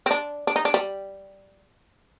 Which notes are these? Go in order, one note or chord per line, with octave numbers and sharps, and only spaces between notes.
C4
D4
D4
D#4
D4
G3